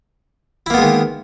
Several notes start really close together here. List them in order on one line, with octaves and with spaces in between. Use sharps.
E4 A#3 B3 G#3 D#3